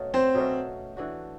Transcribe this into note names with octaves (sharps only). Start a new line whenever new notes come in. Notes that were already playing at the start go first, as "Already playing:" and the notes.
Already playing: B2 F#3 A3 C#4
C4 C5
B2 F#3 A3 C#4
E3 A3 D4 F#4